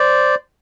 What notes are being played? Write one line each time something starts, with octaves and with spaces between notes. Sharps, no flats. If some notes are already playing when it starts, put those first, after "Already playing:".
Already playing: C5 D5